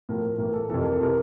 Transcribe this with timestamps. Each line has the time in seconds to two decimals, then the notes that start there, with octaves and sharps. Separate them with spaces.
0.09 A2 F3 A#4
0.38 A2 E3 A#4
0.53 A4
0.69 F2 C3 E3 A4
0.81 A#4
0.92 A4
1.01 C3 E3 A#4